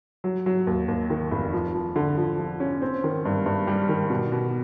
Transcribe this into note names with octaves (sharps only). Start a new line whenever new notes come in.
F#3
F#3
D#2
D#2
D#3
F1
F3
F3
D3
F3
F3
C#4
C4
D#3
G2
G2
G3
D#3
B2
B2